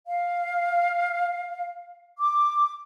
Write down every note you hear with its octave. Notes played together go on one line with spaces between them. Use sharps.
F5
D6